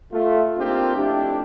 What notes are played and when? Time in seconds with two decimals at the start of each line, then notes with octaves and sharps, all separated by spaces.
0.12 A3 F4
0.58 A#3 C4 D4 D#4 F4 G4
0.96 F2 A3 D4 E4 G4